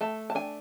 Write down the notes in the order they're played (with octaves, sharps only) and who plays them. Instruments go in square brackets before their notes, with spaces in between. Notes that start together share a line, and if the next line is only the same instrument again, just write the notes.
[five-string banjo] A3 A5
A5
D4 G#5